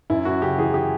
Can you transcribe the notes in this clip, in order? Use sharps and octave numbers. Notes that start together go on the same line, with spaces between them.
F#2 E4
F#2 F#4
C#3 G4
E3 G#4
G4